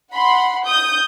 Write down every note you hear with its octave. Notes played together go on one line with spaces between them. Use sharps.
F#5 B5 C6
D#6 G6